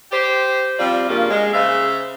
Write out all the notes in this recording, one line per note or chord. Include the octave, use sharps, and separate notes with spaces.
G4 C5
F3 G3 C4 D5
G2 C#3 A#3 F4
G#3
C#3 C5 E5 F5